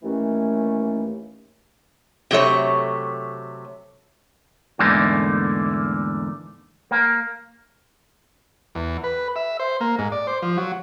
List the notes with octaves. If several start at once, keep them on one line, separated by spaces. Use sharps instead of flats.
D#2 E3 A3 C#4
C3 F#3 A3 C#5
E2 G#2 D3 A3 A#3
A#3
E2
B4
E5
C5
A#3
G#2
D5
C5
F3
F#3